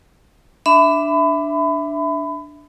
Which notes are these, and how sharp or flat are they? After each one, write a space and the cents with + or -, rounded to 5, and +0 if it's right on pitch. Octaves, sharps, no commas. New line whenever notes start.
D4 +0 E5 +0 B5 +30